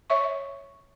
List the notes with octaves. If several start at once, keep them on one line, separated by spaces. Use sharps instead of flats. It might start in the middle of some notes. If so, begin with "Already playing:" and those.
C#5 E5 C#6